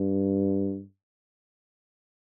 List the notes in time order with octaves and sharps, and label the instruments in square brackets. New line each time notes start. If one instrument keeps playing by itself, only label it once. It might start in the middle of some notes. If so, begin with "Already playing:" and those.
Already playing: [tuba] G2